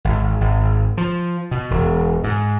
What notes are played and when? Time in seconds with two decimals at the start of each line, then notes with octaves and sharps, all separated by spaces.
0.05 G#1
0.41 G#1
0.98 F3
1.51 B2
1.71 E1
2.24 G#2